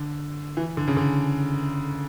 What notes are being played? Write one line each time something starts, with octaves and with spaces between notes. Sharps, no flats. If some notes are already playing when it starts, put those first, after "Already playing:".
Already playing: D3
E3
D3
C#3
D3